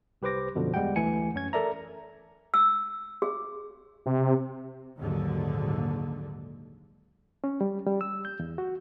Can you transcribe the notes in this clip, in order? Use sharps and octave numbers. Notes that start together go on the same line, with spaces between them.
C2 G4 B4 C5 D6 A#6
F#2 B2 D3 F3
E2 G3 G#3 F#5 G5
D2 E3 A3 G#5 C#7
F#2 C#4 G#6
A4 A#4 D5 E5 A#5
E6
G#4
C3
A#1 D#2 G#2 D3 F#3
C#4
G3
G3
E6
G6
E2
F#4